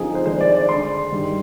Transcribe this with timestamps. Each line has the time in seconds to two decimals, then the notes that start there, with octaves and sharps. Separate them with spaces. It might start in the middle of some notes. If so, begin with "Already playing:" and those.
Already playing: D3 F3 C4 D#4 G#4
0.15 C5
0.26 D#3 G#3 D4 C5
0.41 D5
0.55 D5
0.69 D3 G#3 D4 C6
1.11 G2 D#3 G3